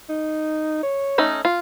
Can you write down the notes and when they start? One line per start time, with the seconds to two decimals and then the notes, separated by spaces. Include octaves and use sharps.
0.09 D#4
0.83 C#5
1.18 A3 C#4 D#4
1.45 F4